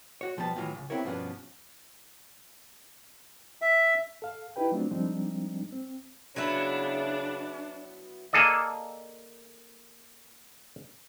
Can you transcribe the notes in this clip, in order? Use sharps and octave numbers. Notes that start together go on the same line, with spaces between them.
F#4 C#5
B1 F3 G3 B3 A5
A2 D#3 E3 F#3 F4
C#2
B3 C4 E4 G4 A#4 C#5
G2 B2 F3 B3 C#4 D4
E5
A4 F5
D#4 E4 G4 B4 G5
F#3 A3 B3 C4 D4 F4
F3 G3 G#3 C4 D4 D#4
C4
C#3 F#3 B3 D4 E4
A#3 G#4 A4 D5 D#5